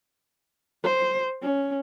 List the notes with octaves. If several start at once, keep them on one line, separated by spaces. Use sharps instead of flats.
C5
C#4